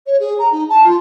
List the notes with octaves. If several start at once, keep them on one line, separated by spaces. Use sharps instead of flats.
C#5
G#4
A#5
D#4
A5
F4